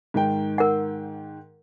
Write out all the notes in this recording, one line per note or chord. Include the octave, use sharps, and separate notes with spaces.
G#2 D#3 G5
A#4 F#5